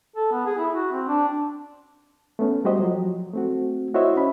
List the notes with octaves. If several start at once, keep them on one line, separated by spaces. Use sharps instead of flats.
A4
B3
G#4
E4
F#4
C4
D4
A3 B3 C#4
G3 F#4 G4 C5 D#5
F3 F#3
A3 C4 F#4
E4 F#4 C5 C#5 D#5 E5
C#4 B5